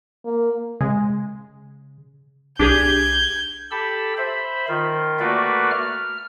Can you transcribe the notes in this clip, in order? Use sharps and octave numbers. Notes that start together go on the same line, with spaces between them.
A#3
C#3 G#3
C2 D4 G4 G#4 G6 G#6
G4 A4 B5 E6
C5 E5 B5
D#3 F4
A3 A#3 F#4 B4 D5 E5
F6